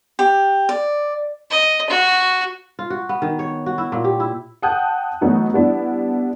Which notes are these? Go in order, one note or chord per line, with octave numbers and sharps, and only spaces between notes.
G4
D5
D#5
F#4
F4
F#4
B3
D#3
C#5
F#4
E4
A#2
G4
E4
F#5 G5 A5 D#6 F#6 G6
E3 F#3 A3 B3 D#4
G3 B3 D4 E4